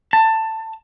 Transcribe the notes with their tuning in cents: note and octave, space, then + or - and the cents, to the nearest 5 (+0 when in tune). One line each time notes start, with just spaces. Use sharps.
A5 +15